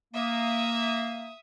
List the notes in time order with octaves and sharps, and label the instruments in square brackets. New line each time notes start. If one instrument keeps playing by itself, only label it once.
[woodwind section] A#3 [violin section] E5 D#6